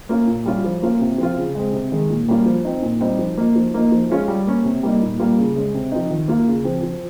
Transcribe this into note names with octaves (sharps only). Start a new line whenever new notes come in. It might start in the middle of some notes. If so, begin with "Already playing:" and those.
A#3 C#4 F4
A#2
G3 C#4 F4
F3
A#3 C#4 F4
C3
F3 C4 F4
C#3
G#3 C4
C3
D#3 G#3
A#2
G3 A#3 C#4 F4
F3
C4 D#4
A#2
G3 C4 D#4
F3
A#3 D#4
F3
A#3 D#4
F3
G#3 C#4 F4
G3
A#3 C#4
C3
G3 A#3 D#4
A#2
G3 A#3 F4
C#3
G#3 C#4
C3
F3 C4 D#4
D#3
A#3 F4
C#3
F3 C4
F3